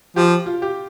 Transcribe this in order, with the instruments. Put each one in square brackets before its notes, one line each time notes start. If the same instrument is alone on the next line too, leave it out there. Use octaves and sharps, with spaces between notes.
[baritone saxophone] F3 [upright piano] G4
[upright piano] F4
G4